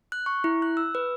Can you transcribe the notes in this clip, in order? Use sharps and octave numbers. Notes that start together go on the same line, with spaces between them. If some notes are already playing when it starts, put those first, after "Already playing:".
F#6
C#6
E4
F#6
E6
B4